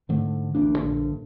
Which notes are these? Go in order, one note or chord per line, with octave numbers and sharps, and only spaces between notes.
G#2 D3 A3
A1 D2 A#3 D4
A#1 G2 D3